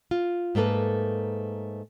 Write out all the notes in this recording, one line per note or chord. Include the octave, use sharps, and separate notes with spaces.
F4
G#2 A3 A#3 A4 B4